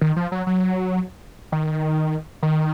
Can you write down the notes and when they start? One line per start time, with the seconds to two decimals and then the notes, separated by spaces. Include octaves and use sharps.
0.01 D#3
0.16 F3
0.32 F#3
0.47 F#3
1.52 D#3
2.43 D#3